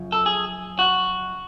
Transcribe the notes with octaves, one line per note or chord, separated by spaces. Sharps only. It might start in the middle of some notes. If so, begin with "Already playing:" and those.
Already playing: F#2 C#3 F3
A4
G#4
F#4